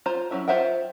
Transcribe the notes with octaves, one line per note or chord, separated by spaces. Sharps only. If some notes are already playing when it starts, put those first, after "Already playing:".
F4 C5 A#5
F#3 C#4 E4
F4 C5 E5 F#5 G5